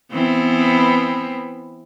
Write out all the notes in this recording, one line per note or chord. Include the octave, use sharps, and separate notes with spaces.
E3 B3 C4